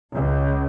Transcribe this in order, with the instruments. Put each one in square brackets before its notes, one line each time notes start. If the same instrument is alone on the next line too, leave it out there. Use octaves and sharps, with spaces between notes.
[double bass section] C#2